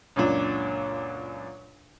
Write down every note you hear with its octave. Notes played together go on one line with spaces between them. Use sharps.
C#2 F#2 A#2 D4